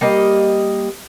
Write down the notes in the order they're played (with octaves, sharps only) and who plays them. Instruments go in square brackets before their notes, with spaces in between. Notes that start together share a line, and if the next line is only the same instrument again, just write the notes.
[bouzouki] G3 A#3 D#5